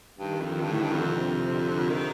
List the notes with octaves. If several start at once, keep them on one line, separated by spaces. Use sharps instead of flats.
G2 D#3
F2
G2 D3
A2
G2
F2
C3
D3
D#3